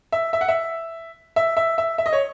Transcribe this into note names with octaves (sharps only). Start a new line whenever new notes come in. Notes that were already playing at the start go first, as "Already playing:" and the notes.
E5
E5
F#5
E5
E5
E5
E5
E5
D#5
C#5